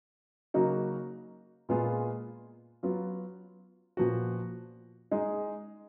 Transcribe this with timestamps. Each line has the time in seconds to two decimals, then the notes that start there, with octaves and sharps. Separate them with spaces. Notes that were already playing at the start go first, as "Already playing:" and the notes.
0.54 C#3 F#3 A#3 D#4 F#4
1.69 A#2 G#3 B3 F4 G#4
2.83 F#3 B3 F4
3.97 A#2 F3 B3 F#4
5.11 G#3 D#4 G#4